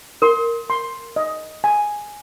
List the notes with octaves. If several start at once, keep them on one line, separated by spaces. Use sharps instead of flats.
A#4 C6
C6
D#5
G#5